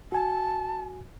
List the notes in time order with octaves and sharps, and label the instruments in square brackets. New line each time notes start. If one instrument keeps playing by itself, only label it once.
[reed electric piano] F#4 G#5 [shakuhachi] A5